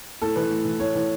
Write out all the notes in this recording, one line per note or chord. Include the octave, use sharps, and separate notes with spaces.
A2 A4
E3 B4
A2
E3
A2 C#5
E3